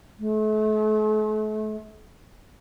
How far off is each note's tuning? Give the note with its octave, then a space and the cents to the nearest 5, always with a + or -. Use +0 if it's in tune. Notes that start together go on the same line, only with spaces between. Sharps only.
A3 -40